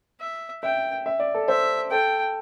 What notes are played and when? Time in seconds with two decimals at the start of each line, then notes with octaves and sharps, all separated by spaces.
0.21 E5
0.63 E5 G5
1.06 E5
1.20 D5
1.35 A4
1.48 C5 E5
1.91 A4 G5